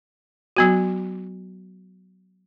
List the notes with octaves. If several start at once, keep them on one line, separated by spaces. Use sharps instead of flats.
F#3 B3 F#4